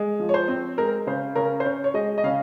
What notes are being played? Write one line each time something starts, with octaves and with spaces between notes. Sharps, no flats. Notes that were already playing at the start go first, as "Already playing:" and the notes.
Already playing: G#3
F3
C#5
C5
C4
G#3 A#4
C#3 C5
C#3 A#4
C5
C#4 C#5
C#5
G#3 D#5
D#5
C#3 F5